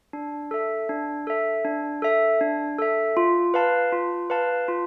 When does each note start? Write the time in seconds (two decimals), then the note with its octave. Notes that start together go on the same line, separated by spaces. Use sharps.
0.13 D4
0.51 A4 E5
0.89 D4
1.27 A4 E5
1.65 D4
2.02 A4 E5
2.41 D4
2.78 A4 E5
3.17 F4
3.54 B4 F5 A5
3.92 F4
4.30 B4 F5 A5
4.68 F4